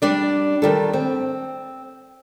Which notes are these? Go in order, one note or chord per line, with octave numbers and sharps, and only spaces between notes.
G3 D4 D5
D#3 G3 A4
C4